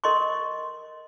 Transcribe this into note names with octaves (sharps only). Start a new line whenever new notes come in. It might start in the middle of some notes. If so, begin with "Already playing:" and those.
A#4 D#5 C6 C#6